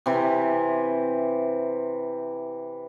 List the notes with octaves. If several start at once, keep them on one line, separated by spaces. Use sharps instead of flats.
C3 E3